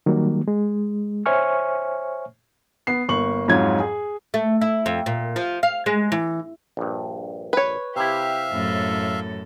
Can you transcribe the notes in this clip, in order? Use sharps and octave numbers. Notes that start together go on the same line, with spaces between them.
D#3 F#3 G3 A#3
G#3
C5 C#5 E5 G#5 C#6 F6
B3 C7
G1 A#3 C#6 F#7
F2 G#2 F#3 F4 G#6
G#4
A3
E4
F2
A#2
F3
F5
G#3
E3
A#1 G2
B4 C#5
C3 E4 G4 E5 F5
F#2 A2 A4